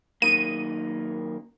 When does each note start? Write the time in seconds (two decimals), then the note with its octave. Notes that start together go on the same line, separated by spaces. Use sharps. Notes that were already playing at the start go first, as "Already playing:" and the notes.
0.22 F#2 D#3 A#3 D#7